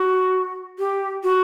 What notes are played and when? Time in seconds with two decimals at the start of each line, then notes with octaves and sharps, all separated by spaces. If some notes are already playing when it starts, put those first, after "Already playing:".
Already playing: F#4
0.79 G4
1.23 F#4